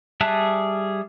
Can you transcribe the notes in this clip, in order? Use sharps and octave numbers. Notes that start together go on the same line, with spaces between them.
G3 G#4 E5 A5 F#6